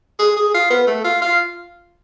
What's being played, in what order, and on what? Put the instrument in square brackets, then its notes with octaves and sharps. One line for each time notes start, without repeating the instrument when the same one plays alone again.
[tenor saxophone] G#4
G#4
F4
B3
A3
F4
F4